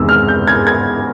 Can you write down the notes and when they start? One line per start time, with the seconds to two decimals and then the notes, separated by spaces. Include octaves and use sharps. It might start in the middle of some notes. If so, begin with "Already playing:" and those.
Already playing: E2 C3 D#3 G#3 E6
0.09 F6
0.28 G6
0.47 G#6
0.67 G#6